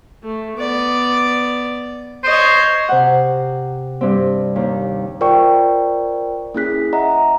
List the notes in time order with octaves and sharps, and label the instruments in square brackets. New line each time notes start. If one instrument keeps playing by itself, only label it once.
[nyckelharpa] A3
B3 D5
[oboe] C5 [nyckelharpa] C#5 D#5
[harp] C3 F#5
G2 C4
D#2
[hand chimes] F4 A#4 C5 D5 G5 C#6
A#3 C#4 E4 G#4 F#6 B6
D#5 E5 F#5 A#5